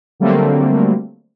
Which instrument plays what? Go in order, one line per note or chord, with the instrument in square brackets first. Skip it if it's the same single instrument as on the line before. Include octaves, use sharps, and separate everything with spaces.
[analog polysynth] D3 F#3 G3 A3 A#3 C4